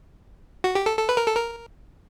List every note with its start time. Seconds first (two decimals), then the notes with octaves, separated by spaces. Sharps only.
0.64 F#4
0.75 G4
0.86 A4
0.98 A4
1.09 B4
1.17 A#4
1.27 A4
1.35 A#4